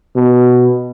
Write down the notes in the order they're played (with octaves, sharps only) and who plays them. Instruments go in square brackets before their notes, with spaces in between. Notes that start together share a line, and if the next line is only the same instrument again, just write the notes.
[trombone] B2